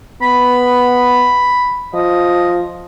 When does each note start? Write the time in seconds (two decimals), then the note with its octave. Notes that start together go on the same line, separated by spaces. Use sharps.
0.22 B3 B5
1.94 F3 D#5